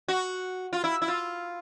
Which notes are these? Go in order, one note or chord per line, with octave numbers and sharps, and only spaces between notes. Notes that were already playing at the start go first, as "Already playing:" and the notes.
F#4
F4
E4
E4
F4